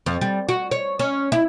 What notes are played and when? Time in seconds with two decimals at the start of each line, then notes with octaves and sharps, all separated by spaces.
0.06 F2
0.21 G3
0.49 F#4
0.71 C#5
0.99 C#4
1.32 E4